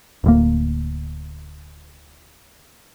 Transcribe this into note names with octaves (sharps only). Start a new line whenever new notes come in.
D1 D2 A#3